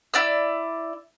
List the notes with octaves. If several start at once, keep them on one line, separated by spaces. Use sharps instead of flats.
E4 D5 E6